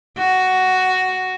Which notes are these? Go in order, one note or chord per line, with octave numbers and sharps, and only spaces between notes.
F#4